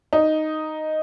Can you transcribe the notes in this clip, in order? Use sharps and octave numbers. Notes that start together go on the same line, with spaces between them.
D#4